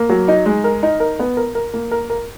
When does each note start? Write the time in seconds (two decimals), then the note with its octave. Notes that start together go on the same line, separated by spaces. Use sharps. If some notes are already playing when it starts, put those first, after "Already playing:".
Already playing: A#3
0.09 F#3
0.28 D#4
0.45 G#3
0.64 A#4
0.83 D#4
1.00 A#4
1.19 B3
1.37 A#4
1.55 A#4
1.74 A#3
1.91 A#4
2.10 A#4